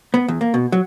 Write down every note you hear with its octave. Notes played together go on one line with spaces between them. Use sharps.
B3
E2
A#3
B2
F#3